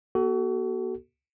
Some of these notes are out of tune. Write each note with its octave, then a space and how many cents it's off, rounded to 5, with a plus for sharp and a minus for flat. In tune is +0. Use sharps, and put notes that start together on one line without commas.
A#3 +45 F#4 +35 A4 +0